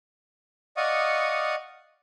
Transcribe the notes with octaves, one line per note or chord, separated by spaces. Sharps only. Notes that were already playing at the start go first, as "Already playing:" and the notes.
D5 D#5 F5 F#5 C#6 D#6